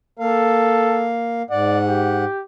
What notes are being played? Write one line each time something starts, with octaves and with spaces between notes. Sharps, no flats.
A#3 A4 F5
G#2 D5 F#5
G4